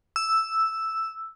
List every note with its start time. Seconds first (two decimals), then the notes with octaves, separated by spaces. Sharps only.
0.16 E6